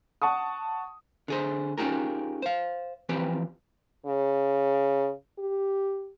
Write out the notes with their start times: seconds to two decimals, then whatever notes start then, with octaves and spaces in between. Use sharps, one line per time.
0.22 F#5 A5 C#6 D#6
1.28 D3 G#4 C5
1.78 C#4 D#4 F4 G4 G#4 A#4
2.42 C5 F5
3.09 E3 F3 C4 G4 B4
4.06 C#3
5.39 G4